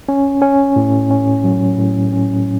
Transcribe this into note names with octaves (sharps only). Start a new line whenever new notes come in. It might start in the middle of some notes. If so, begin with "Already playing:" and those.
C#4
C#4
A2
C#4
F#3
A2
C#4